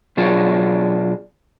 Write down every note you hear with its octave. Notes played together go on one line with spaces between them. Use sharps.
B2 F#3 D4 F4 G#4